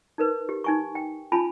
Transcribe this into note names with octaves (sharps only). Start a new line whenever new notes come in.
D#4 A#4 B4
G4
D#4 G#5 C#6
G5
C#4 F4 G#5 A5 B5